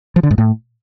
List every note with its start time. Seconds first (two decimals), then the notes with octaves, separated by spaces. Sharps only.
0.16 F3
0.23 D3
0.31 G#2
0.38 A2